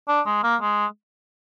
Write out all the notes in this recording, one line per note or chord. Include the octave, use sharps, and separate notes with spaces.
D4
G#3
A#3
G#3